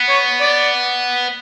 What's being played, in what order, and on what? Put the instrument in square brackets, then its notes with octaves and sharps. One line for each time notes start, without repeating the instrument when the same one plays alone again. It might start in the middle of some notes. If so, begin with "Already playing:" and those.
Already playing: [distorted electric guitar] B3
[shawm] C#5
D5